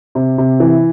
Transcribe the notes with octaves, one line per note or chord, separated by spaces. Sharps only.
C3
C3
E3